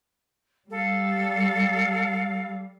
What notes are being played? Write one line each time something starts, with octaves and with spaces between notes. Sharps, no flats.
G3 A4 F5